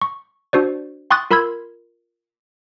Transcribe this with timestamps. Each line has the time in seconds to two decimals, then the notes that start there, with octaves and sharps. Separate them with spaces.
0.02 C#6
0.53 D4 F#4 C5 D5
1.11 G5 C6 C#6 D#6 F#6 A6
1.31 F4 A#4 B5 C6 E6 G#6